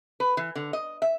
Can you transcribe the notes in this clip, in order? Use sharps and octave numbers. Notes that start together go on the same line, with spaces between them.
B4
E3
D3
D#5
E5